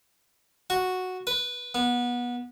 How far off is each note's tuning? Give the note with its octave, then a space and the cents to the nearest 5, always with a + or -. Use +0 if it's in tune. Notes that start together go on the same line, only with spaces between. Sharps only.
F#4 -5
B4 -10
B3 -25